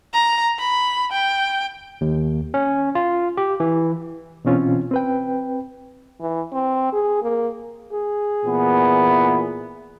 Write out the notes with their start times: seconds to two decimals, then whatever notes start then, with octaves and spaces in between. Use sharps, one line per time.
0.14 A#5
0.59 B5
1.12 G5
2.01 D#2
2.54 C#4
2.95 F4
3.37 G4
3.60 E3
4.45 B2 E3 C4 C#4 F4
4.91 C4 B4 G5
6.20 E3
6.53 C4
6.92 G#4
7.22 A#3
7.93 G#4
8.45 A#2 E3 B3